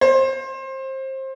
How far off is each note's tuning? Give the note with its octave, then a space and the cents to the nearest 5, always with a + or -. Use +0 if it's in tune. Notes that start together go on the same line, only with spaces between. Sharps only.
C5 +25